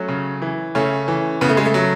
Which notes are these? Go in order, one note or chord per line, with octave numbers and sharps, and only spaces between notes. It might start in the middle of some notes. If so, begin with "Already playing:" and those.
Already playing: F#3 A3 C#4
C#3
E3
C#3 A3 C#4
E3
C#3 B3
A3
G#3
A3
F#3